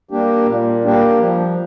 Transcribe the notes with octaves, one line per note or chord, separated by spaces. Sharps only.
G3 A#3 D4 G4
A#2
G3 A#3 D4 G4
F3